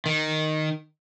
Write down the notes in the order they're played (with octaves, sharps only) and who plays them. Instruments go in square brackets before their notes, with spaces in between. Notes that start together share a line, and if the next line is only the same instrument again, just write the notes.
[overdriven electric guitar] D#3